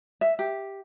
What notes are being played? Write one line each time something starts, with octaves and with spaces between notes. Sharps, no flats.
E5
G4